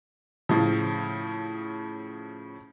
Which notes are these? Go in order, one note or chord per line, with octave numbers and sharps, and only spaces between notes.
A2 C#3 F3